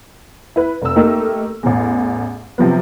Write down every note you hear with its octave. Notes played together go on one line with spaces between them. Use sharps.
E4 B4
F1 E6
A3 A#3 D#4 G4 A#4
A1 E2
C3 F3 F#3 B3